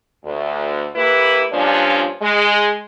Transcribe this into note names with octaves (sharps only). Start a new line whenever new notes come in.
D2
A#3 E4 G4 B4
G2 A#2 F3 C#4 D4
G#3